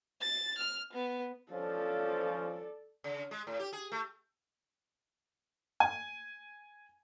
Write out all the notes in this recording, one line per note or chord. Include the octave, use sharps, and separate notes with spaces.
A6
F6
B3
F3 C#4 A4 D5
C#3
G#3
A2
G4
G#4
A3
G#5